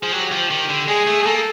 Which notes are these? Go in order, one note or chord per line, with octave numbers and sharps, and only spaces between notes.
F3 G#4
F#3 G4
F3
D#3
D3
G#3 G#4
A3
G#4
A#3 A4